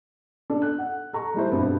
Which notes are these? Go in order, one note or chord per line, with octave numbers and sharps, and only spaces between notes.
D4 A4
F#6
F#5
A4 A#5 C#6
G3 A3 E4 C5
G2 B2 A3 B3 C4